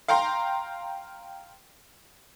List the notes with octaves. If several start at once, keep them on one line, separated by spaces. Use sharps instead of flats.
F5 G5 A#5 C6